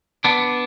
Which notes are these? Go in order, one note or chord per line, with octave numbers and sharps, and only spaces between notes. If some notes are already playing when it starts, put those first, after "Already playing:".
B3 D4